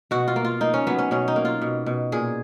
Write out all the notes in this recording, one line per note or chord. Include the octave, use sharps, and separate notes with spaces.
B2 F#4
F4
A#3
F4
A#3 D#4
C#4
F#3 B3
C#4
B2 C#4
D#4
A#3
F4
B2
B2
A#2 G#4